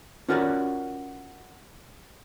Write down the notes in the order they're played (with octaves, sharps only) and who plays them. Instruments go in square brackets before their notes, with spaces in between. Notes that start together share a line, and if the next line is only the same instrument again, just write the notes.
[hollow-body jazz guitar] C#4 F4 F#4 A#4 C#5 D5